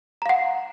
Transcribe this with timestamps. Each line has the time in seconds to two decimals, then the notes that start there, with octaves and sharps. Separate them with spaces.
0.22 A#5
0.26 F5
0.29 F#5